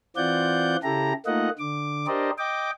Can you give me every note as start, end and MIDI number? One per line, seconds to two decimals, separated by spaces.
0.16 0.76 52
0.16 0.76 60
0.16 0.76 65
0.16 0.76 74
0.16 0.76 78
0.16 0.76 91
0.83 1.13 49
0.83 1.13 64
0.83 1.13 67
0.83 1.13 69
0.83 1.13 82
1.26 1.49 57
1.26 1.49 58
1.26 1.49 63
1.26 1.49 65
1.26 1.49 75
1.26 1.49 78
1.58 2.06 50
1.58 2.06 86
2.07 2.31 62
2.07 2.31 67
2.07 2.31 70
2.07 2.31 72
2.07 2.31 74
2.07 2.31 75
2.38 2.70 75
2.38 2.70 79
2.38 2.70 86